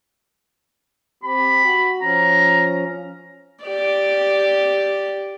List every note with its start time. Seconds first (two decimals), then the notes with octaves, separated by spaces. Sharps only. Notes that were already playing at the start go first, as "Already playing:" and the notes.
1.23 C4 G4 B5
1.64 F#4
2.01 F3 C#4 A#5
3.64 G4 D5